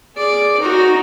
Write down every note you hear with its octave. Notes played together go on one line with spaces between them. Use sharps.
G#4 D5
D#4 F#4